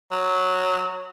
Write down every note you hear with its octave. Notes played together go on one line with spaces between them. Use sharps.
F#3